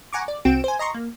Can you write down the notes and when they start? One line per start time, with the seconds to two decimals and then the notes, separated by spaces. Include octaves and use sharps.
0.13 F#5 G#5 A#5 C#6 D6
0.28 D5
0.45 C2 C4 F#4 G5 D7 E7
0.64 C5 G#5
0.79 D#5 A#5 C6 C#6
0.94 A#3